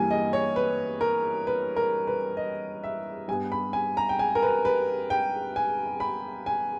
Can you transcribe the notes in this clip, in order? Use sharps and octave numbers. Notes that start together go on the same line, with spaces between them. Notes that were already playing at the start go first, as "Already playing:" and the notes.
Already playing: G2 E3 G3 A#3 G#5
D#5
C#5
B4
A#4
B4
A#4
B4
D#5
E5
G2 G3 B3 G#5
B5
G#5
A#5
G5
G#5
A#4
B4
B4
G5
G#5
B5
G#5